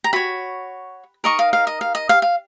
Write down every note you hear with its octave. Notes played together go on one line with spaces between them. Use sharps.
A#5
F#4 C#5 B5
D#4 A#4 D#5 C#6
F5
F5
D#5
F5
D#5
F5
F5